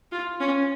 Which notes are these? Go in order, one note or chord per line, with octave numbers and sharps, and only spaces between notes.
F4
C#4